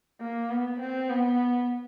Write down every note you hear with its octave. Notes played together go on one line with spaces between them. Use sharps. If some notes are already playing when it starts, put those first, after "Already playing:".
A#3
B3
C4
B3